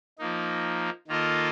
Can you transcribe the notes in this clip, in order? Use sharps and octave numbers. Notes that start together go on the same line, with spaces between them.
F3 A#3 D#4
D#3 A#3 F4 A4 D#5